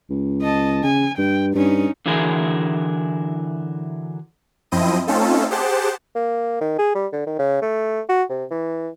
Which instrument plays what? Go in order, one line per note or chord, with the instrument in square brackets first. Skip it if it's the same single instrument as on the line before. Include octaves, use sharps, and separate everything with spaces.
[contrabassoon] C#2
[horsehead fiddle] D#5 A5
[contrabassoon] C#3 [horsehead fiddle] G#5
[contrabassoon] G2 [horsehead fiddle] G5
[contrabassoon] G2 [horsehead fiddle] C#4 D#4
[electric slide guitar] D3 E3 F#3 E4 G#4 A#4
[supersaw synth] F#2 F3 C4 E4 D#5 D#7
A3 C4 C#4 D#4 F4 A4
G4 G#4 C5 F#5 G5 A5
[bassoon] A#3
D#3
G#4
G3
D3
D#3
C#3
A3
F#4
C3
E3